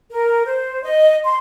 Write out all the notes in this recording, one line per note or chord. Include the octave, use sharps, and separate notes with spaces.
A#4
C5
D#5
C6